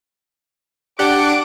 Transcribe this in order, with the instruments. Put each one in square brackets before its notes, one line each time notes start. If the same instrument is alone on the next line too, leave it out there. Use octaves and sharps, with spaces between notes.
[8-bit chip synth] D4 F#5 [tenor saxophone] G4 [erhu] D6